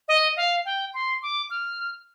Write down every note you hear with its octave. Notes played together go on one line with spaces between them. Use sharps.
D#5
F5
G5
C6
D6
F6